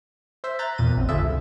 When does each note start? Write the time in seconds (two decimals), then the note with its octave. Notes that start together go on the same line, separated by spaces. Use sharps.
0.44 C5 E5 C6
0.59 A#5 F#6 G6 A6 B6
0.78 E2 A#2 A6 D#7
0.97 A1 F#2 C4
1.09 D3 E4 F4 G#4 A4 E5
1.22 C2